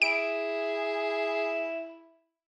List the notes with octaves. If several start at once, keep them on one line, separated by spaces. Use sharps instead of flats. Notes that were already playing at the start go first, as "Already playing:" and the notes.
E4 G#4 D7